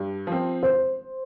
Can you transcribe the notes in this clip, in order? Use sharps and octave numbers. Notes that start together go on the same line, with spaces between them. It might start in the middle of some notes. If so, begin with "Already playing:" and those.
Already playing: G2
F3 C4
C5